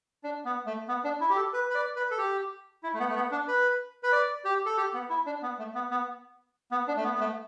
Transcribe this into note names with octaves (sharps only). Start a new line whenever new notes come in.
D4
B3
A3
B3
D4
E4
G4
A4
B4
B4
D5
B4
A4
G4
E4
A3
B3
A3
B3
D4
B4
B4
D5
G4
A4
G4
B3
E4
D4
B3
A3
B3
B3
B3
D4
A3
B3
B3
A3